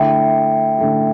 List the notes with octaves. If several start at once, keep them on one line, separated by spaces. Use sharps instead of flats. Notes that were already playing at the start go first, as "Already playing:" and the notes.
Already playing: D3 A3 E4 E5 G5
D3 A3 E4